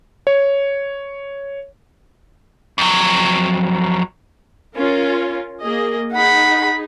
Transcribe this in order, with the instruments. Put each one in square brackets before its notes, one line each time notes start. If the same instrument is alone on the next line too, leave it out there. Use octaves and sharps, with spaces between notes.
[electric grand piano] C#5
[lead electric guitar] F2 F#3
[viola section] C#4 F4 A#4
A#3 G#4 D#5
[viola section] D#4 G#4 [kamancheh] F#5 B5